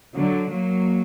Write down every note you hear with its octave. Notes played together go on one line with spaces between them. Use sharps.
D3 F#3
F#3 A#3